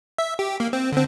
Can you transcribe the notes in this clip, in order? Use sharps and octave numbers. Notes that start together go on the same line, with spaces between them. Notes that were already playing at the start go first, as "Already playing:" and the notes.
E5
G4
A#3
C4
D3 C4